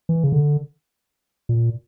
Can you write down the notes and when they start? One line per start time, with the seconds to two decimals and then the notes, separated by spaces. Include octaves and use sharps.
0.09 E3
0.23 C#3
0.32 D3
1.49 A#2